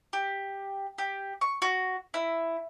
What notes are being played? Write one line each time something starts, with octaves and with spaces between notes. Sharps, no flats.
G4
G4
C#6
F#4
E4